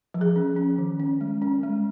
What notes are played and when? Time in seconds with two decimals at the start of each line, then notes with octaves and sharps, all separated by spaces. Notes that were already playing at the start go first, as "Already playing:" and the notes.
0.14 F3
0.21 G#4
0.36 C#4
0.57 C#4
0.78 D#3
1.00 C#4
1.21 G#3
1.42 C#4
1.63 G#3